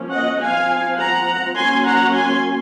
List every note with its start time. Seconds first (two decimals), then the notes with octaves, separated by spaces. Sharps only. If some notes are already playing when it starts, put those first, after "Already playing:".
Already playing: F3 A#3 C#4
0.11 D#5 F#5
0.40 F3 C4 F5 G#5
0.99 F#5 A#5
1.56 F#3 A#3 C#4 G#5 C6
1.85 F#5 A#5
2.14 G#5 C6